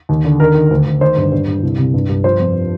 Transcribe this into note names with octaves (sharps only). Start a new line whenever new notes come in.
D#2
D3
D#3 A#4
D#3
D2
D2
D#3 C5
G2
G2
G2
C2
C3
G2
G2
F3 C5
F2